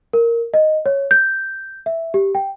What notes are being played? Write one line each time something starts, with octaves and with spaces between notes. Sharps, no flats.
A#4
D#5
C#5
G6
E5
G4
G5